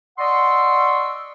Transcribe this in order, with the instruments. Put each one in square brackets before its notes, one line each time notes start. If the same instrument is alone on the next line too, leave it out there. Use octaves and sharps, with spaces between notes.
[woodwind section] D5 D#5 F#5 C6 C#6 E6